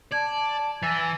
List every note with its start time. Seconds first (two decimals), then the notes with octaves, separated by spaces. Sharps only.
0.12 D5 A5 G#6
0.82 E3 G#5 E6 A6